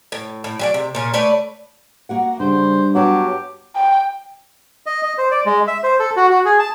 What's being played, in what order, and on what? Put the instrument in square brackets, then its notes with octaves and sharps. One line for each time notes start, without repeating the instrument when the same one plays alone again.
[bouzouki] A2
A2
F#3 G4 D5
C3
A#2 C#4
A3 B4 C#5 D5
[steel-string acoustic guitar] A#3 F#4 F#5
[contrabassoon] G2 [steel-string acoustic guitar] C#3 G3 [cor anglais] C5
[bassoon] F#3 [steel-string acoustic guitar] B3 F#4 A5 [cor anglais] G4
[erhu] G5
[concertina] D#5
D#5
C5
D5
G#3
E5
C5
A4
F#4
F#4
G#4
A5